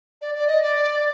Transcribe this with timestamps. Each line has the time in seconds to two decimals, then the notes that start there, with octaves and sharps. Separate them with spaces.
0.22 D5
0.35 D5
0.48 D#5
0.62 D5